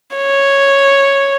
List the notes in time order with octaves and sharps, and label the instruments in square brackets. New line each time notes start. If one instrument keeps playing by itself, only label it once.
[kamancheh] C#5